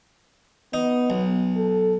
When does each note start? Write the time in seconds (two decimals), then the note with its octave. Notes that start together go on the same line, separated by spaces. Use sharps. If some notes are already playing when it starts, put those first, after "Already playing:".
0.74 B3 D#4
1.10 B1
1.56 A4